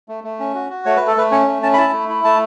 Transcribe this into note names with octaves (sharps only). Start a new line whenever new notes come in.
A3
A3
C#4
F#4
F#4
A3 C#5
A3 B4
A4
A3 B4
C#4 C#5
A3
C#4 A5
B5
E4 A5
A3
E4
A3 A5